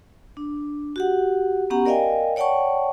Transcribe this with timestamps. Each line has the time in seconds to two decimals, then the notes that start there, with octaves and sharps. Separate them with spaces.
0.37 D4
0.96 F#4 G4 F#5
1.70 B3 C#4 G4 F#5 A#5
1.86 A#4 D5 D#5 F5 G5 G#5
2.36 C#5 D5 F#5 G5 A5 C#6